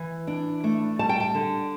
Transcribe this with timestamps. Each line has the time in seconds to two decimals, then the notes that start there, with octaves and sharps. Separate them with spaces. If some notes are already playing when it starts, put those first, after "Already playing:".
Already playing: E3
0.27 D4
0.64 A3
0.99 G3 A5
1.09 G5
1.20 A5
1.35 D3